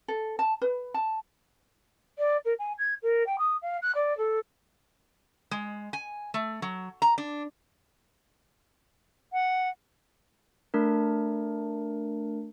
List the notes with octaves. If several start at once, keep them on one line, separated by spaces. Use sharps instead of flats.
A4
A5
B4
A5
D5
A#4
G#5
G#6
A#4
G5
D#6
F5
F#6
D5
A4
G#3
G#5
A3
F#3
A#5
D4
F#5
A3 D4 A#4